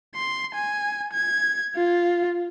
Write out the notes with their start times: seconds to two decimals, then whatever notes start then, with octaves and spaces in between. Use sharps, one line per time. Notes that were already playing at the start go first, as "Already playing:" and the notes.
0.15 C6
0.54 G#5
1.13 G#6
1.75 F4